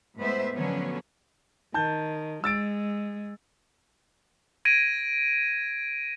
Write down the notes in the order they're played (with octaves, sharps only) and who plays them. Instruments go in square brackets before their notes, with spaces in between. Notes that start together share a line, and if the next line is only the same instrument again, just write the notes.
[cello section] A2 G#3 B3 B4 C5 E5
D3 F3 F#3 B3 C#4
[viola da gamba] D#3 [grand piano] A5 G6
[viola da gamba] G#3 [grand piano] E6 A6 D7
[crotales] G#6 A#6 D7 D#7